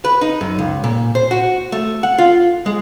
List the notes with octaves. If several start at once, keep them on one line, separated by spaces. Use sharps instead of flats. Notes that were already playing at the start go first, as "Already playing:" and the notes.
B4
D#4
F#2
C#2
A#2
C5
F#4
A3
F#5
F4
G#3